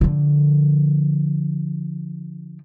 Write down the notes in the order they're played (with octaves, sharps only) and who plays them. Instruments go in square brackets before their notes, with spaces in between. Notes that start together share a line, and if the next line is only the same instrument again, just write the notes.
[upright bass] D3 F3